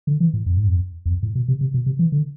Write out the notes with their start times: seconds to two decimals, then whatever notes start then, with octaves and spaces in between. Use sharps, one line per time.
0.07 D3
0.20 E3
0.34 A2
0.46 F2
0.57 G#2
0.68 F2
1.06 E2
1.10 F2
1.23 A2
1.35 B2
1.48 C3
1.61 C3
1.74 B2
1.86 C3
1.99 E3
2.12 D3